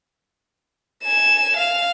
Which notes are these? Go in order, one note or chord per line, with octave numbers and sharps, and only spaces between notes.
G#5 E7
F5